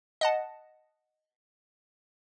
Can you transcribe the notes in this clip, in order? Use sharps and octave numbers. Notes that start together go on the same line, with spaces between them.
D#5 F#5 A5